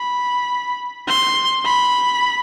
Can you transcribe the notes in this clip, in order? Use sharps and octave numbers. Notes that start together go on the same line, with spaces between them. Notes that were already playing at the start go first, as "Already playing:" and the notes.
Already playing: B5
C6
B5